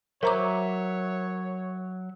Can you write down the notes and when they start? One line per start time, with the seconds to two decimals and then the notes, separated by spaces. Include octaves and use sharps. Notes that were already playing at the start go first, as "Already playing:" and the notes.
0.23 F#3 A#4 C5 C#5 E5 A#5 C#6 D6